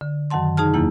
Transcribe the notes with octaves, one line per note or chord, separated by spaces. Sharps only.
D3
F#2 D#3 F#3 F#5 A5 C6
C3 D#4 G#4 A5 F6
E2 F#3 A#3 E4